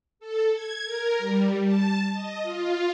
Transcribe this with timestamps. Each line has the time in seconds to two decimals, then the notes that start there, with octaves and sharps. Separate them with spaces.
0.19 A4
0.53 G#6
0.85 A#4
1.18 G3
1.64 A5
2.12 D#5
2.43 F4